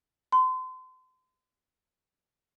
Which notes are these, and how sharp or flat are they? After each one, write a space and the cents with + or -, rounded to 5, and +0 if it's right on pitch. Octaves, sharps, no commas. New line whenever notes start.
C6 -35